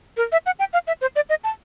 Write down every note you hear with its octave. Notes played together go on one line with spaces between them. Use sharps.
A#4
E5
F#5
G5
F5
E5
C5
D5
D#5
A5